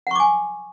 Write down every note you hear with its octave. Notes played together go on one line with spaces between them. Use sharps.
F#5 G#5 C#6 D6